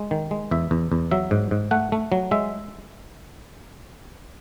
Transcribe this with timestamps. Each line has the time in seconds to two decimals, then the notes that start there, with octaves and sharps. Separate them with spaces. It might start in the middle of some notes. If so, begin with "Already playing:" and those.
Already playing: G#3
0.11 D#3
0.31 G#3
0.51 E2 E5
0.71 E2
0.92 E2
1.11 F#3 E5
1.31 G#2
1.51 G#2
1.71 A3 F#5
1.92 A3
2.12 F#3
2.31 G#3 E5